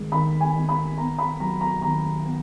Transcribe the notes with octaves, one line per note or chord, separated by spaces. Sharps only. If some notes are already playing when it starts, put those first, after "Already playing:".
Already playing: D#3 G#3
D#3 B5
G#5
D#3
B5
B3 A#5
B5
F#3 A#5
A#5
D#3 A#5
B3